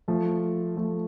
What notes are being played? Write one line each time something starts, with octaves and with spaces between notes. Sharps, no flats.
F3 A3
F3 A3